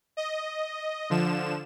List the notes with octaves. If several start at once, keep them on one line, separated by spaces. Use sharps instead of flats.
D#5
D3 F3 E7